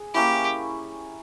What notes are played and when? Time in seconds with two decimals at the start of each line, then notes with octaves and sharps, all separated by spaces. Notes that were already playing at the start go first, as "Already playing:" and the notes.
Already playing: G#4
0.14 A#3 C#4 E4 G4